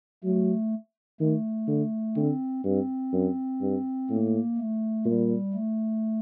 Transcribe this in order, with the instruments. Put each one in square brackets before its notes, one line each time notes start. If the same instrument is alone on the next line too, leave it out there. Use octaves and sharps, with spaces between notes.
[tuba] F#3 [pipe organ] A3
[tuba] D#3 [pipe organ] A3
[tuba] D3
[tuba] D3 [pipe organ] C4
[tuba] G2 [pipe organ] C4
[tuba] F#2
G2
[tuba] A2 [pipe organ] A#3
[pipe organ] A3
[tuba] A#2 [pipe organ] G3
[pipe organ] A3